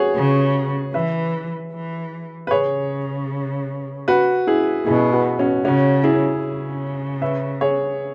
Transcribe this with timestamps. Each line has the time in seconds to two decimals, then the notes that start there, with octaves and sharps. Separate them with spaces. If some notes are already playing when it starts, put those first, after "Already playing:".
Already playing: F#4 G#4 B4 C#5
0.16 C#3
0.94 E3 B4 E5
1.72 E3
2.47 B4
2.51 C#3 G#4 C#5
4.08 F#4 B4
4.47 E4 G#4
4.86 B2 E4 G#4
5.12 F#4 B4
5.39 C#4 F#4
5.65 C#3 C#4 F#4
6.04 E4 G#4
6.43 C#3
7.22 B4 E5
7.61 G#4 C#5